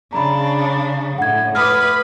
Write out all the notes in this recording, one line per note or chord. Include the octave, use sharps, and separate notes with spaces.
C#3 D4 A#5 B5
A2 F#5 G#6
B4 D6 D#6 F6